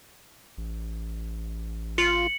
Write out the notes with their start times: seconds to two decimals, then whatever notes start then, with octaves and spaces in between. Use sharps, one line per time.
0.58 A1
1.98 F4 C#7 F#7